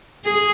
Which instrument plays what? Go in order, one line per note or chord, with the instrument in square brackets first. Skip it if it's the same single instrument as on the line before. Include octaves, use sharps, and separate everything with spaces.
[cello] G#4